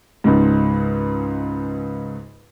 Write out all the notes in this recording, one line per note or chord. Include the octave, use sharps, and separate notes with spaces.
C#2 G#2